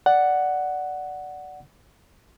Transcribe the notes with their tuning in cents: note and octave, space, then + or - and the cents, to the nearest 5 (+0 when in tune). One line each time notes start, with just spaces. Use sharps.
D5 +0 F#5 +5